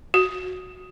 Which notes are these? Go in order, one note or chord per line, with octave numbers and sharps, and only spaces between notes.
F#4